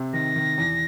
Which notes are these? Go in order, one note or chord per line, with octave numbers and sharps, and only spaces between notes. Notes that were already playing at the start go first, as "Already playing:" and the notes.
Already playing: C3 C4
D#3 A#6
D#3
E2